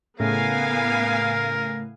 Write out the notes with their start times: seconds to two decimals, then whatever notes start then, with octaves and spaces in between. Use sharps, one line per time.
0.20 A2 C#3 A3 B3 A#4 F5 G#5